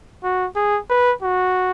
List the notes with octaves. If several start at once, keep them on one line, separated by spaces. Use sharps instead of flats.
F#4
G#4
B4
F#4